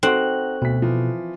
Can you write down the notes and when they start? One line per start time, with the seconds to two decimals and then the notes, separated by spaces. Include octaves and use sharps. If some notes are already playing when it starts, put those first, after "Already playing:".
0.03 C4 D#4 F#4 A4 F#6 F#7
0.62 D2 B2 B6
0.82 E3 F3